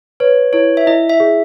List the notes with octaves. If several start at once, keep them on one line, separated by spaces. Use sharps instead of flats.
B4 C#5
E4 C#5
E5
E4 D#5
E5
G#4